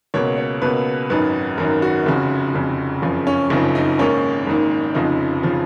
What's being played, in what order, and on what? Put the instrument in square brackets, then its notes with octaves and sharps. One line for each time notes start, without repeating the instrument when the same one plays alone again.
[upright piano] C#2 B2 A#3 C#5
C#5
C#2 B2 A#3 B4
G#1 F#2 D#3 B4
G#1 F#2 D#3 A#4
F#4
F1 F2 C#3
F1 F2 C#3
F#1 F2 C#3 F3
C#4
F#1 F2 C#3 F3 D#4
D#4
G#1 G#2 D#3 A#3 C#4
G#1 G#2 D#3 A#3
F1 F2 C#3 F3 D#4
C#3 F3